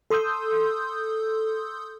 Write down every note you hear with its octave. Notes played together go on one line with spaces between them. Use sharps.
A4 C6 D#6 E6 G6